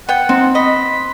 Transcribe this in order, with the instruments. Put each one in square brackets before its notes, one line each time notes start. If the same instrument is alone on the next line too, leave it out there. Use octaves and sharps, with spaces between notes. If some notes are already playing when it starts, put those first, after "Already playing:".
[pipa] B3 G5 [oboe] F#5
[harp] C4 [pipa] D#4
[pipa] D#5 [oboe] B5